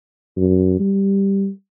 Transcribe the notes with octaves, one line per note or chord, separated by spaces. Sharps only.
F#2
G3